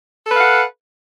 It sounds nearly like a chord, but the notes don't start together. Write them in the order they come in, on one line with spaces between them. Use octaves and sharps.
A4 B4 F5 F#5